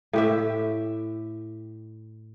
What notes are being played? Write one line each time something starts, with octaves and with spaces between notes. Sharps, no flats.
A2 G4 E5